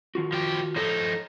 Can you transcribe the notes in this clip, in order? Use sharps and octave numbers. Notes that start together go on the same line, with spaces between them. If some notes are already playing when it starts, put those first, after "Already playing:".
D#3 F4 F#4
F3 G4
F3 D#4 A4 C#5